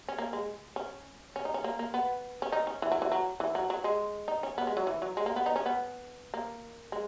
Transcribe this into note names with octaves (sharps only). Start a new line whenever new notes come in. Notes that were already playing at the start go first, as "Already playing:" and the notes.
C#4
A#3
G#3
C#4
C#4
D#4
C#4
A#3
A#3
B3
C#4
D#4
C#4
E3
F#3
E3
F#3
E3
F#3
F#3
G#3
D#4
C#4
B3
G#3
F#3
E3
F#3
G#3
A#3
B3
D#4
C#4
B3
A#3
G#3